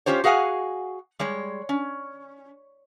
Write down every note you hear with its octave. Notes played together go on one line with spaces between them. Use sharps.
C#4 F4 G4 C5 C#5
F#4 G#4 F5 F#5 G#5
G3 G#3 C#5
C#4